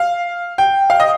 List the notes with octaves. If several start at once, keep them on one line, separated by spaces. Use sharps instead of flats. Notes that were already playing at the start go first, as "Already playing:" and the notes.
Already playing: F5
G5
F5
D#5